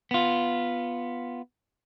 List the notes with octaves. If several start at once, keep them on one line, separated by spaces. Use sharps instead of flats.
B3 F4